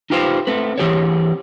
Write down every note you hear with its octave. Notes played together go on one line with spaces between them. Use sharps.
D#4 F4 G4 B4 C5
A3 C4 B4
E3 C4 G4 G#4 C5 C#5